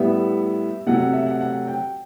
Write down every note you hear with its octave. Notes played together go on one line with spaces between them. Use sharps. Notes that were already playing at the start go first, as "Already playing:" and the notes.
Already playing: A2 G3 B3 E5
C3 F#3 A3 F#5
F#5
E5
F#5
F#5
G5